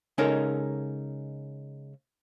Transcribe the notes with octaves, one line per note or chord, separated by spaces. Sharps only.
C#3 G#3 C#4 D#4 A4 A#4